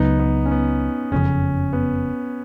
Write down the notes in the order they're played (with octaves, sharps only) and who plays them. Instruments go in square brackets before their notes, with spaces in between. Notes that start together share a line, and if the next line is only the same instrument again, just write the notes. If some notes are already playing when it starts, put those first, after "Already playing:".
Already playing: [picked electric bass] C#2 C#3 F#3 [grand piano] B3 D#4
[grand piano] B3
C#4
B3
[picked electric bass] F#1 F2 C#3 [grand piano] C#4
[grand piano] B3